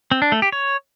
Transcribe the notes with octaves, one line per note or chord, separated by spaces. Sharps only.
C4
D4
A3
G4
C#5